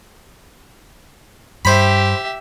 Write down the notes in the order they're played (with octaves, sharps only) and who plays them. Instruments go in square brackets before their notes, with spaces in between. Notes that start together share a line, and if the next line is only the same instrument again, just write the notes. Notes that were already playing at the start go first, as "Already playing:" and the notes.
[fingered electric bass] G2 [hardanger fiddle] G4 E5 [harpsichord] C5 B5